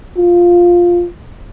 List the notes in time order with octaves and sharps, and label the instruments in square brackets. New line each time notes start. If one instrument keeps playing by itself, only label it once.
[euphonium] F4